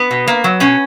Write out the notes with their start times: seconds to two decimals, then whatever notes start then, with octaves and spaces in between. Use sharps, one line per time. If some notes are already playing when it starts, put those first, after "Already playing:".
Already playing: B3
0.11 B2
0.28 A#3
0.44 F#3
0.60 B2 C#4